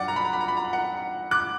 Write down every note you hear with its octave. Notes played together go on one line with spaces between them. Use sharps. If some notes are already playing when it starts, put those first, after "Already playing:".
Already playing: G2 F#3 D5 F#5
A#5
B5
A#5
B5
A#5
B5
A#5
B5
F#5 A#5
D6 F#6